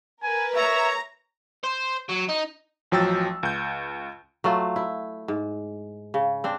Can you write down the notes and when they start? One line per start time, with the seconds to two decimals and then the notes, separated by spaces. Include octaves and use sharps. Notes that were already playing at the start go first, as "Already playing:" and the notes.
0.23 A#4 B4 G#5
0.57 C#5 E5 A#5
1.64 C5
2.09 F#3
2.28 D#4
2.92 A1 F3 F#3 G5 E6 A6
3.43 C#2 G6
4.44 F#3 A3 F4
4.76 E4
5.28 G#2
6.14 C#3
6.44 C4 D4